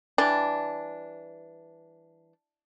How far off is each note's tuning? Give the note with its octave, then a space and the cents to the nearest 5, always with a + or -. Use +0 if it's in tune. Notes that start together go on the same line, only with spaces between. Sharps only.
E3 +0 G3 +0 D4 +0